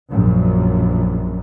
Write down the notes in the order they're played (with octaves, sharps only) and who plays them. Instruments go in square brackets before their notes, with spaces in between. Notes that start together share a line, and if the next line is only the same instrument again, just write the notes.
[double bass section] A#1 F#2